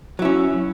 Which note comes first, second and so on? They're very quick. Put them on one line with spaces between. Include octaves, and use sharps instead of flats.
F#3 E4 C#4